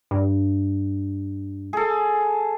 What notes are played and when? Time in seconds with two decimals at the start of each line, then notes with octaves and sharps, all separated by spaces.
0.11 G2
1.73 G#4 A4